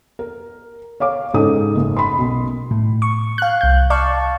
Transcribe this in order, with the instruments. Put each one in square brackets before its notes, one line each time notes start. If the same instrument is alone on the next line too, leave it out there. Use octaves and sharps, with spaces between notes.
[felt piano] A#4
C#5 F5 D6
G#2 C#3 D#4 A4 D#6
F#1
B5 C6
B1
[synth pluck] A2
C#6
F5 F#6
C2 G6
D5 F5 A5 C#6